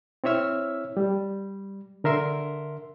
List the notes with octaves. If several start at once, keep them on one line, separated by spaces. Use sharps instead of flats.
C4 E4 C#5 E5 E6 F6
G3
D3 A#4 E5 C6